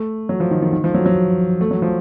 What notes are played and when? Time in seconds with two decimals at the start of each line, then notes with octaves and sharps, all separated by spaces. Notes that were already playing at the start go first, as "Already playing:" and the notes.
Already playing: A3
0.29 F#3
0.40 F3
0.51 D#3
0.62 D#3
0.73 D#3
0.84 F3
0.94 F#3
1.06 F#3
1.61 A3
1.71 F#3
1.82 F3